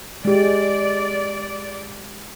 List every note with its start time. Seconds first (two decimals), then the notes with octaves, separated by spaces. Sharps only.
0.25 G#3 G4 D5